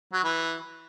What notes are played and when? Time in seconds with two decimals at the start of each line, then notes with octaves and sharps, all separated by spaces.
0.13 F#3
0.24 E3